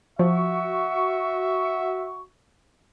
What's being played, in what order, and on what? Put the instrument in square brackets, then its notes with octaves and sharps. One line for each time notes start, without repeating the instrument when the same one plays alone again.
[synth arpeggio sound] F3 [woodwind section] F#4 C#6 [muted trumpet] E5